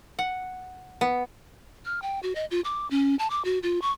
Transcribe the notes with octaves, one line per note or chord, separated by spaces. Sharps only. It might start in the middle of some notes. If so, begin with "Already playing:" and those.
F#5
B3
F6
G5
F#4
D#5
F4
D6
C#4
A5
D6
F#4
F4
C#6